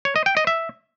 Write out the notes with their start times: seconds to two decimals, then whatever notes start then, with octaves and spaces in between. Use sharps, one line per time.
0.05 C#5
0.16 D#5
0.26 G5
0.37 D#5
0.47 E5